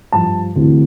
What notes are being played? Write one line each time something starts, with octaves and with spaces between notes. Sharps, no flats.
G2 F3 A5
D2 C3 E3